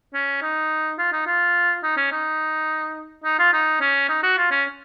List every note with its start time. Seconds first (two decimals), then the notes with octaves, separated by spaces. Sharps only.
0.14 C#4
0.42 D#4
0.98 F4
1.13 D#4
1.27 F4
1.83 D#4
1.97 C#4
2.12 D#4
3.24 D#4
3.39 F4
3.53 D#4
3.81 C#4
4.09 D#4
4.23 F#4
4.38 F4
4.51 C#4